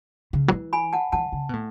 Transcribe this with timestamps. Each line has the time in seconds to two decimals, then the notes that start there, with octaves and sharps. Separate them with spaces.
0.33 C#3
0.48 F#3
0.52 E3
0.73 G#5 B5
0.93 F#5 A5
1.12 E3 F#5 A5
1.32 C#3
1.49 B2
1.53 A2